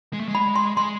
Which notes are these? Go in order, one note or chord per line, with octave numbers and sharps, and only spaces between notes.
G#3
A3
G#3
B5
C6
G#3 C6